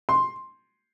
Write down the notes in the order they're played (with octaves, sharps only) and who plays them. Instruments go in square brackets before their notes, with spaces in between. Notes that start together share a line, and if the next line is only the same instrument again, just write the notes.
[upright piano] C6